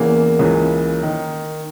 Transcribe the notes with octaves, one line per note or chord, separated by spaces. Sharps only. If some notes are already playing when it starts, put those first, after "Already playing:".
Already playing: E2 C#3 E3 A#3
C#2 C#3 E3
D#3